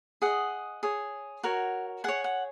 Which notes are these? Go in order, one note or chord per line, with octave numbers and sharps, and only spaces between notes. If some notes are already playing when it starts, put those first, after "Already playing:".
G#4 D#5 F#5
G#4 C#5
F#4 A#4 C#5
G#4 C#5 F#5
F#5